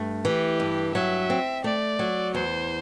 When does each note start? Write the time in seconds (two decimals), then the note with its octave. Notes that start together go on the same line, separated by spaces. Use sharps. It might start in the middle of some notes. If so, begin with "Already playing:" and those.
Already playing: G2 A3
0.25 E3 G4
0.60 G2
0.94 F#3 E5
1.30 C4
1.64 A3 D5
1.99 F#3
2.34 E2 C5